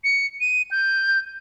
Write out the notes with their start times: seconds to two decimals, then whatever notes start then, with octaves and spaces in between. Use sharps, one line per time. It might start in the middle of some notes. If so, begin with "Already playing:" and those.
0.04 C#7
0.41 D#7
0.71 G6